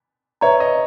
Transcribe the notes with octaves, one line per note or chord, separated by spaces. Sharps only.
B4 C#5 E5 A#5
D#5